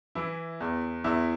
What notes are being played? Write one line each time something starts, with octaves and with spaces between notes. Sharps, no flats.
E3 E4
E2
E2 E4